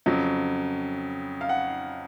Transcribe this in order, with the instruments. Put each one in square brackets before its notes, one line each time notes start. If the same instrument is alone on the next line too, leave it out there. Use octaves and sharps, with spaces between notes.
[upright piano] F2 C#3 F#3
F5
F#5